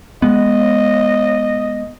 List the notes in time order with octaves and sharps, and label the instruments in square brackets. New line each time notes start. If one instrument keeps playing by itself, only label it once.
[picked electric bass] G#3 B3 [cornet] D#5